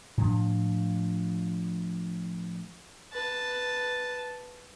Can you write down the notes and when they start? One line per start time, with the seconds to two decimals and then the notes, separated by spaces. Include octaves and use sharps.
0.18 A2 F3 D4
3.13 B4 A5